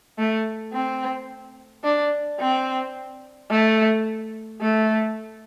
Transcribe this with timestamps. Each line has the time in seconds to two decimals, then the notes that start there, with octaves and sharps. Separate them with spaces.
0.18 A3
0.73 C4
1.84 D4
2.40 C4
3.50 A3
4.61 A3